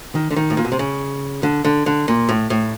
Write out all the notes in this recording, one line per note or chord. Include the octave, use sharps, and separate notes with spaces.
D#3
D3
D#3
A2
A#2
B2
C3
C#3
D3
D3
D3
A#2
A2
A2